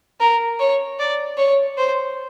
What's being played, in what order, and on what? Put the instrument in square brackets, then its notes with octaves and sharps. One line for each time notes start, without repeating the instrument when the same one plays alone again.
[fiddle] A#4
C#5
D5
C#5
C5